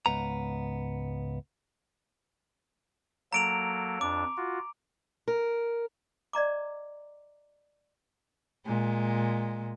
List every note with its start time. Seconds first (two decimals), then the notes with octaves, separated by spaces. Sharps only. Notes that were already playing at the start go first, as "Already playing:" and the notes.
0.06 C#2 G#2 B3 A#5
3.33 F#3 A#3 A4 A#5 D7 F7
4.01 F2 D4 D6
4.37 F4 F#4
5.28 A#4
6.33 D5 D#5 A#5 D6
8.66 A#2 G#3